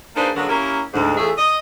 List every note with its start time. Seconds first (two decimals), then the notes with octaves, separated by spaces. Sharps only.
0.15 A#3 D4 D#4 G#4 B4 C5
0.36 D3 F#3 G#3 A#3 B3 C#4
0.48 A#3 C#4 E4 G4 A#4
0.94 D2 G#2
1.16 E2 A3 F4 G#4 C#5 E5
1.37 D#5